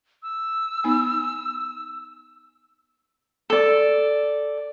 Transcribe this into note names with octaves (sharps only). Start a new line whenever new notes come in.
E6
B3 D#4 G#5
A4 D5